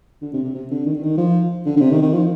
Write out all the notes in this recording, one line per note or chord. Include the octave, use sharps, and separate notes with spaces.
D3
C3
C3
C3
D3
D#3
D3
D#3
F3
D3
D3
C3
D#3
D#3
F3